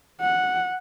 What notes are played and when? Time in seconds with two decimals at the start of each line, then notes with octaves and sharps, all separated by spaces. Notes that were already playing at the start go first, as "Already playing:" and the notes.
0.21 F#5